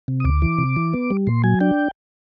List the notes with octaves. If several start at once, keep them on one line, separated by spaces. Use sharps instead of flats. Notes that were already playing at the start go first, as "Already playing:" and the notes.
C3
D#6
D2 D6
E3
C3
E3
B3
G3
A#2 C6
F#3 G#5
D4 G5